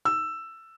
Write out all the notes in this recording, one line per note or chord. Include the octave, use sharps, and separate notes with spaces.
E6